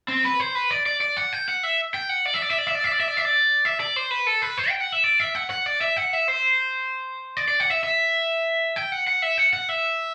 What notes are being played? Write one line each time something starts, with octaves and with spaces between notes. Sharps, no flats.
C4
B4
C5
B4
D5
D5
D5
F#5
G5
F#5
E5
G5
F#5
D5
E5
D5
E5
D5
E5
D5
E5
D5
E5
D5
E5
D5
E5
D5
C5
B4
A4
B4
C5
G5
F#5
E5
D5
E5
F#5
F#5
D5
E5
F#5
E5
C5
D5
D5
F#5
E5
E5
G5
F#5
F#5
E5
F#5
F#5
E5